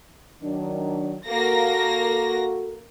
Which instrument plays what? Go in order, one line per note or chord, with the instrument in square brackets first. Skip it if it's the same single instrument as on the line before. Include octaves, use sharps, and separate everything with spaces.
[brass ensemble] D#3 F#3 D4
[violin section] A#3 A#6 [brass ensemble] F#4 A4